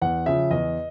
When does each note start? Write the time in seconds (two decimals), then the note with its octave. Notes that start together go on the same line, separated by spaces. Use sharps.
0.02 E2 F#5
0.26 C#3 F3 E5
0.51 E2 D#5